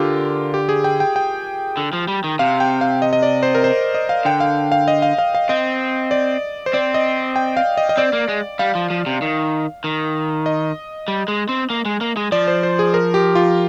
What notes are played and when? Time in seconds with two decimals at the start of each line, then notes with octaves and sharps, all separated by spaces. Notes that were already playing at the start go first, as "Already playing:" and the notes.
Already playing: D3 F4 G4 A#4
0.54 G4
0.69 G#4
0.84 G5
1.00 G5
1.16 G5
1.77 D3
1.93 F3
2.08 G3
2.24 D#3
2.39 C3 F5
2.60 G5
2.81 F5
3.02 D#5
3.13 D#5
3.23 D5
3.43 C5
3.55 A#4
3.64 C5
3.95 D#5
4.09 F5
4.25 D3 G5
4.40 F5
4.72 F5
4.88 D#5
5.02 F5
5.18 F5
5.35 F5
5.49 C4 D#5
6.11 D5
6.66 C5
6.73 C4 D5
6.94 D#5
7.36 G5
7.57 F5
7.77 D#5
7.89 D#5
7.97 C4 D5
8.13 A#3
8.28 G#3
8.59 G3 F5
8.75 F3
8.90 F3
9.06 C3
9.22 D#3
9.84 D#3
10.46 D#5
11.08 G3
11.28 G#3
11.49 C4
11.70 A#3
11.85 G#3
12.01 A#3
12.17 G#3
12.32 F3 D5
12.48 C5
12.63 C5
12.79 G#4
12.94 A#4
13.14 G4
13.35 F4